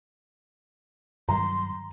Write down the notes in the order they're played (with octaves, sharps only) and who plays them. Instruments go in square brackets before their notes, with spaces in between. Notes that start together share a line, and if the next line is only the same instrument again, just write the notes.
[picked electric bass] G2 D#3 F#3 [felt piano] A#5 [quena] C6